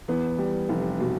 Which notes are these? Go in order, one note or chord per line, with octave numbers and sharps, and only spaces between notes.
E2 B3
G3
F1
B2